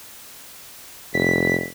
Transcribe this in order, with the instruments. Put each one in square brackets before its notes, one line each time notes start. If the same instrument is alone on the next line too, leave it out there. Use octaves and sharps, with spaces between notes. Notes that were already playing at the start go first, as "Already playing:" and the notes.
[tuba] F1 [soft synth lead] B6